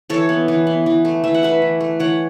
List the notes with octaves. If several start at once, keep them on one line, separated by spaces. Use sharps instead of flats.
E3 A4 C#5
B3
E3
B3
E3
A3
E3 E5
F#5
A3 B4 E5
E3
A3
E3 C#5 F#5